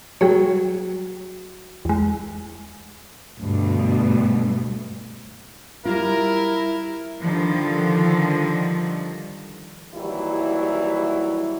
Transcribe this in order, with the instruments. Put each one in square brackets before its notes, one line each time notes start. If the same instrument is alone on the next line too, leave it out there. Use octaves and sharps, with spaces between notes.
[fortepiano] F#3 [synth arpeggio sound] G3 G#4 C#5
[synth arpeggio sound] E2 G#3
[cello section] D2 G2 B2
[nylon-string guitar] G3 F4 [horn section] E4 A#4
[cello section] D3 D#3 F3 G3
[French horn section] D#2 E3 F#3 G3 E4